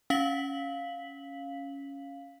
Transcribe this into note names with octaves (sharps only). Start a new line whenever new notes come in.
C#4 F5 B6 F#7